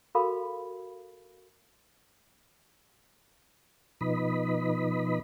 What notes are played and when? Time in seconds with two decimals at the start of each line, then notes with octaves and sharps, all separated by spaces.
0.15 F#4 A4 A#4 F5 B5
4.01 B2 F3 D#4 B4 D#5 B5